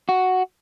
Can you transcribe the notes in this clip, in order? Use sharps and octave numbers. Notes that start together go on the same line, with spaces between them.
F#4